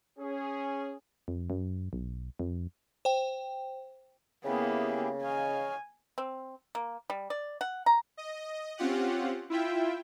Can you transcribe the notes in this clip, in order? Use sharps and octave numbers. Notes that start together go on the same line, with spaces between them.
C#4 G#4
F2
F#2
B1
F2
C5 G5
C#3 A#3 B3 E4 G4 G#4
C#5 D#5 F5 G#5
C4
A#3
G3
D5
F#5
A#5
D#5
C4 C#4 F4 G4 F#5
E4 F4 E5 G5